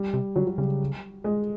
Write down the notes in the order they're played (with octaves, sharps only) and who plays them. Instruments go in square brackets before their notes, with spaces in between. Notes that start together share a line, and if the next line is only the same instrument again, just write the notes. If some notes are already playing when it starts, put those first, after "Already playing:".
Already playing: [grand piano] G3
[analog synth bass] C3
[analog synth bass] D3 [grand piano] F#3
[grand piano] F#3
[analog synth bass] C#3 [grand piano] G3
[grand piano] G#3